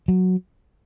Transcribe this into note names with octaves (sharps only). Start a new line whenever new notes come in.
F#3